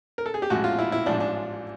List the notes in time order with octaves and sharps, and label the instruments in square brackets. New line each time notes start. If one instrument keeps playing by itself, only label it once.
[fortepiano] A#4
A4
G#4
G4
A1 A2 F3 G#3 F#4
F4
E4
E4
A1 G#2 F3 D4
D4